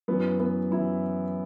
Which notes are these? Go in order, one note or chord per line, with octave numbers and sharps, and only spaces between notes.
F#2 E3 B3
B3
F#2 E3 E4